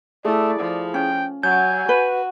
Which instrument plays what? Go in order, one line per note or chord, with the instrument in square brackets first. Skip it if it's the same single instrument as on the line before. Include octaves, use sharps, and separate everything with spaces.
[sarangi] A3 [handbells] E4 G#4 [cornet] D5
[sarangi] F3
[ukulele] C#4 [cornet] G5
[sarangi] F#3 [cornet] G#5 [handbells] G6
[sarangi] F#4 [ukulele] B4